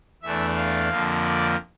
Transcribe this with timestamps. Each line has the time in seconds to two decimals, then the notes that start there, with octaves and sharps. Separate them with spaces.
0.23 E2 E3 A3 D4 E5
0.56 F5
0.90 F2 D3 F3 A#3
1.23 D5